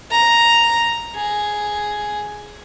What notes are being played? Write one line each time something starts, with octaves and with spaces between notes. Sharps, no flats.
A#5
G#4